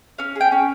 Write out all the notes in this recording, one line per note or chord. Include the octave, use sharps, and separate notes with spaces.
C#4 F5
G#4
G5
C#4